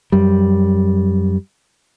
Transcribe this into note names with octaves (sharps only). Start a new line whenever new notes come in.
F#2 G3